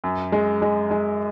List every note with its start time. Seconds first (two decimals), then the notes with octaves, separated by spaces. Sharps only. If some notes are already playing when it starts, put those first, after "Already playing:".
0.04 F#2
0.32 G#3
0.62 G#3
0.91 G#3